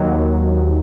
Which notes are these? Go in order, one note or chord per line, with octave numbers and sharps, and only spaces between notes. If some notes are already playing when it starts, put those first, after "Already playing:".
Already playing: D#2 D#3 F#3